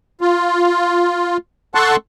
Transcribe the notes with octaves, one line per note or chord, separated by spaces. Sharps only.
F4
A4 F#5 A5 C6 C#6 F#6